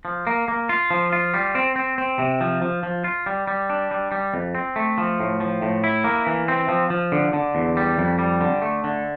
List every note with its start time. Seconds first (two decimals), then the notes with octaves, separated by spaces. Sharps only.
0.05 F3
0.27 A#3
0.48 A#3
0.69 F4
0.91 F3
1.13 F4
1.34 G3
1.55 C4
1.76 C4
1.98 C4
2.19 C3
2.41 F3
2.62 F3
2.83 F3
3.04 F4
3.26 G3
3.48 G3
3.70 D4
3.91 G3
4.12 G3
4.34 F2
4.55 C4
4.76 A3
4.98 F3
5.20 A2
5.40 F3
5.62 A2
5.84 E4
6.04 A#3
6.27 E3
6.48 C4
6.69 F3
6.90 F3
7.12 D3
7.33 D3
7.55 E2
7.77 G3
7.98 F2
8.19 G3
8.41 D3
8.62 A3
8.84 D3